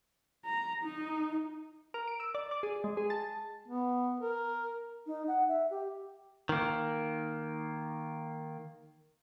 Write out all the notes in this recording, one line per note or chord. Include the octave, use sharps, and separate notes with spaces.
A#5
D#4
A#4
D7
E6
D5
D5
G#4
G#3
G#4
A5
B3
A#4
D#4
F#5
E5
G4
D#3 A#3